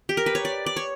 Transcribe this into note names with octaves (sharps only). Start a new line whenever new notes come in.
G4
A#4
B4
C#5
D5
D5
C#5